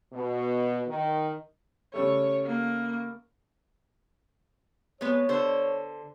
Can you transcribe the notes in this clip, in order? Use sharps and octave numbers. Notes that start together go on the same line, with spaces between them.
B2
D#3
C#3 G3 A3 C#5
A#3
G#3 B3 C#5
D3 C5